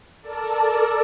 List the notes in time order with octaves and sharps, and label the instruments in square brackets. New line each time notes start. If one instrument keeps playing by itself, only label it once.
[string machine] A4 A#4 D5 A5